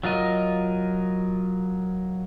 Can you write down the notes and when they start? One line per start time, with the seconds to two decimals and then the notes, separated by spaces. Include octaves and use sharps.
0.03 F#3 F4 A#4 D#5